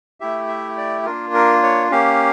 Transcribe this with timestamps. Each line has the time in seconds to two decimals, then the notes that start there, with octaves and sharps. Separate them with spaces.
0.20 A3 E4 G4 E5
0.48 E5
0.77 D5
1.06 A#3 D4 F4 A#4
1.34 A#4
1.63 C#5
1.91 A#3 C#4 G4 F5